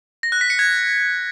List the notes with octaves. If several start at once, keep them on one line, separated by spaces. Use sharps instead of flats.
A#6
F#6
B6
C#7
G#6